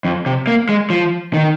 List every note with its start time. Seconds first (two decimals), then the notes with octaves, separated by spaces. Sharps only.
0.05 F2
0.26 C3
0.47 A#3
0.69 G#3
0.90 F3
1.34 D#3